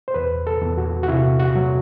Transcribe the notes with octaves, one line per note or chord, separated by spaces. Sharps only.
C5
E2 B4
A4
E2
F#4
F#4
C3 E4
F#4
F#3